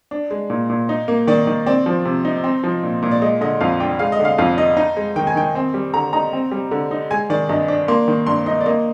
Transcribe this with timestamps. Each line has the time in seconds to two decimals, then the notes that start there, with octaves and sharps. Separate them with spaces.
0.11 D4
0.31 G#3
0.50 A#2
0.70 A#2
0.89 D#4
1.08 A#3
1.27 D#3 D5
1.47 D#3
1.66 C4 D5
1.86 F3
2.05 C3
2.25 D#4
2.44 C4
2.64 F3
2.83 A#2
3.02 A#2
3.11 D5
3.22 G#3 D#5
3.41 D3 D#5
3.61 F2 F5
3.80 D4 G5
3.99 G#3 F5
4.12 D#5
4.19 D3
4.25 F5
4.38 F2 F5
4.57 D#4 D#5
4.77 D#4
4.97 G#3
5.16 D#3 G5
5.27 G#5
5.36 D#3 G5
5.55 C4
5.74 G3
5.94 D3 A#5
6.13 D#4 A#5
6.33 C4
6.51 G3
6.71 D3
6.91 D#4
7.10 G#3 G#5
7.30 D#3 D5
7.49 G2 D#5
7.68 D4
7.88 A#3 C6
8.08 D#3
8.26 G2 C6
8.46 D#4 D#5
8.61 D5
8.66 A#3 D#5